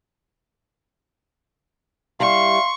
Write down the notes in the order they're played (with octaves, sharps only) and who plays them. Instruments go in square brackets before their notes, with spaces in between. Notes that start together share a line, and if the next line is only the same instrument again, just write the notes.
[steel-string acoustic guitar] G3 E4 [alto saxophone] F5 [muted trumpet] C6 [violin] C#6